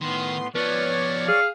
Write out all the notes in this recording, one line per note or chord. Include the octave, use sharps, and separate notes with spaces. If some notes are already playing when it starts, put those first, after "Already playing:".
A2 D#3 B3 C6
F3 B3 B4 C#5 D5 F6
G#4 F5